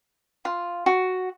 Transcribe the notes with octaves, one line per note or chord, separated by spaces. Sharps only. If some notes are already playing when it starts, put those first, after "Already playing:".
F4
F#4